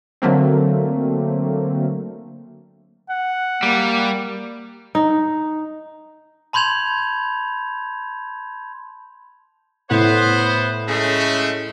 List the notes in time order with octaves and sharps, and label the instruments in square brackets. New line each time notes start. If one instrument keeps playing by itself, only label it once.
[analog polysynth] D3 F#3 A3 A#3 C4
[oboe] F#5
[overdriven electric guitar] G3 [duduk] A#3
[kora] D#4
[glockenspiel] A5 B5 C6 G6 G#6 F7
[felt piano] A2 [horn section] B3 C5
[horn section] C#3 G#3 A3